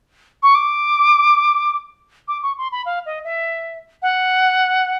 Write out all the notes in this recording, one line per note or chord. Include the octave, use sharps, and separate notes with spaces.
C#6
D6
D6
C#6
C6
B5
F5
D#5
E5
F#5